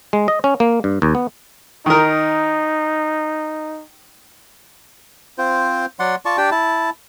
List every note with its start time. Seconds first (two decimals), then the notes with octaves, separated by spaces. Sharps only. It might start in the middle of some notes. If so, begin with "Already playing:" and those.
0.13 G#3
0.28 D#5
0.44 C#4
0.60 A#3
0.84 G2
1.02 D#2
1.15 B3
1.86 D#3 D#4 A#4
5.38 C4 F4 C5
5.99 F#3 D5 F#5 C6
6.25 F4 D5 A5 C#6
6.37 D4 G4 D5 G5
6.51 E4 A5